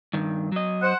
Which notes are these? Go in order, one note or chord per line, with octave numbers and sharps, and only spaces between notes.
G2 D#3
F#3 D#5
C5 F#5